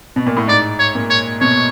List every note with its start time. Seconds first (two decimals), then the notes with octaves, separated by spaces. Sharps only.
0.16 B2
0.27 A#2
0.37 A2
0.47 G#2 D5
0.79 C#5
0.95 A#2
1.10 C#5
1.41 B2 C#5